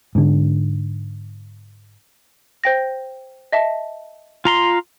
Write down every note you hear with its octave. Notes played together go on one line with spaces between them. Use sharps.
G#2 D3
C5 G5 A#6
D#5 E5 A5
F4 A#5 C6